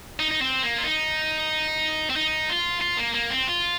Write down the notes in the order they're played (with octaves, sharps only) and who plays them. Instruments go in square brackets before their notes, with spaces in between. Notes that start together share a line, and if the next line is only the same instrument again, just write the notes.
[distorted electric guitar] D#4
D#4
C4
A#3
F4
D#4
C4
D#4
F4
F4
A#3
A#3
C4
F4